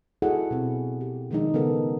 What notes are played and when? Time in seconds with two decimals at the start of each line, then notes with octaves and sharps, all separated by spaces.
0.22 E4 F#4 G#4 A4 D#5 F#5
0.51 B2 C4
1.01 G4
1.31 D#3 F3 G#3 D4 D#4
1.54 C#3 B3 C#4 A4 A#4